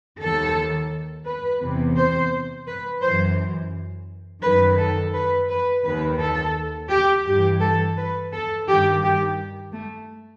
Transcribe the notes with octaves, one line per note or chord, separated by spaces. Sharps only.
D#2 D#3 A4
B4
E2 C3 E3
C5
B4
F#2 E3 C5
F#2 D#3 B4
A4
B4
B4
D#2 D#3 B4
A4
G4
G2 E3 G4
A4
B4
A4
G2 D#3 G4
G4
A3